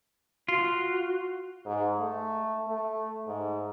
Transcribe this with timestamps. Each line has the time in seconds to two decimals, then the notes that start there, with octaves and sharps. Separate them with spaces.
0.48 F4 F#4
1.65 G#2
1.99 A3
2.68 A3
3.27 G#2